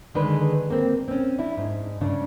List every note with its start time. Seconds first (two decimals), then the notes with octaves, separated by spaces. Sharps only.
0.14 D3 D#3 G#3 D4 G#4 B4
0.70 A#3 C4
1.08 C4 C#4
1.38 D4 E4
1.57 G#2
2.01 G2 C#3 D4